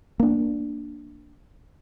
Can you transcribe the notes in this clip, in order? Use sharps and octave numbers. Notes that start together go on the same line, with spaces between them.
A#3 D4